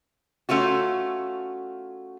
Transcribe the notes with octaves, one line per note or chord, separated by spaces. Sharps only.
A3 C#4 F4 F#4